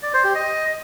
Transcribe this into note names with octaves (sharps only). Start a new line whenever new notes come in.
D5
C5
G4
D#5